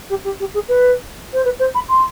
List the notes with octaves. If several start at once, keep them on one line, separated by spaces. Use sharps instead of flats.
G4
G4
G4
G#4
B4
C5
B4
C5
B5
C6